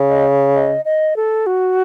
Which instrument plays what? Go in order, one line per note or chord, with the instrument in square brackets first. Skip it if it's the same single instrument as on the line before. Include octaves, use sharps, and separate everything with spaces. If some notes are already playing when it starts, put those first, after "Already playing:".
Already playing: [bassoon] C#3
[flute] D#5
D#5
D#5
A4
F#4